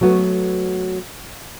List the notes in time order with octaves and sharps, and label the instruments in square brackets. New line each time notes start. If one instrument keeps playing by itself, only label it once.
[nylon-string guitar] F#3 A3 B3 F#4